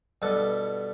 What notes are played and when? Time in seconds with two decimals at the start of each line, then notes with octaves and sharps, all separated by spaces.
0.22 G2 B2 A4 F#5